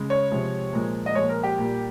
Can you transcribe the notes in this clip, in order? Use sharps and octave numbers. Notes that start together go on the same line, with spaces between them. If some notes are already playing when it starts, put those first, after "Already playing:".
Already playing: C#3 G#3
C#5
C3 F3 G#3
A#2 F3 G#3
D#5
A#2 F3 G#3 C#5
A#4
G4
A#2 G3